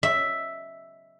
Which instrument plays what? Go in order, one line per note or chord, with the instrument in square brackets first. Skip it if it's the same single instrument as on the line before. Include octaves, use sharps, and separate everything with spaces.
[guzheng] E5